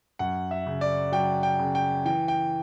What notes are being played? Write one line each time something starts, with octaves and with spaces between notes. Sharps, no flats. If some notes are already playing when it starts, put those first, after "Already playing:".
F#2 F#5
E5
C#3
D5
F#3 G5
G5
C#3
G5
E3 G5
G5